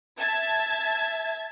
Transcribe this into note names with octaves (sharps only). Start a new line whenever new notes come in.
E5 A5 G#6